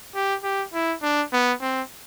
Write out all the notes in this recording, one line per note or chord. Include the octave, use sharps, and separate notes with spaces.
G4
G4
E4
D4
B3
C4